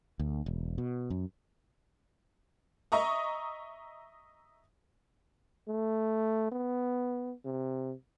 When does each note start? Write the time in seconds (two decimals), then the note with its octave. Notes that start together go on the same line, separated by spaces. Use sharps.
0.19 D2
0.46 E1
0.78 B2
1.10 F#2
2.92 D#5 E5 A#5 C#6 D#6
5.68 A3
6.52 B3
7.45 C3